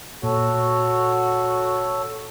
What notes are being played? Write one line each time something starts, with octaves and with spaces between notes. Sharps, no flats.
A#2 F#4 A4 C#5